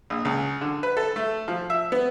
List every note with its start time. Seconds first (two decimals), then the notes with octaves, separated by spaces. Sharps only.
0.10 A#1
0.25 C#2
0.61 D3
0.83 B4
0.97 A4
1.16 A3
1.48 F3
1.70 E5
1.92 B3